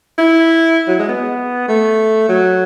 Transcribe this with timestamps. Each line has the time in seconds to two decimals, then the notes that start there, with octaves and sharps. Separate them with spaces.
0.18 E4
0.88 F#3
0.99 G#3
1.08 B3
1.68 A3
2.29 F#3